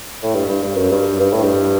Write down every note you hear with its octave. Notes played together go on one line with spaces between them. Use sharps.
A2
G2
G2
G2
F#2
G2
G2
A2
G2